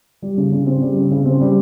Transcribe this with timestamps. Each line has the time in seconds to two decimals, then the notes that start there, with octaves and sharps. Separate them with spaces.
0.22 G3
0.37 C#3
0.51 C#3
0.66 C4
0.82 G3
0.96 C#3
1.11 C#3
1.26 C4
1.41 G3